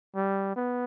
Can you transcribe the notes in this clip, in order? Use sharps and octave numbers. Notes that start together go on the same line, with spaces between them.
G3
B3